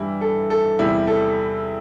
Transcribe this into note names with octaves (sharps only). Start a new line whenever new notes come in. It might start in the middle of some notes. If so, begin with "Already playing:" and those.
Already playing: G2 E3 G3 E4
A4
A4
E2 C3 G3 E4
A4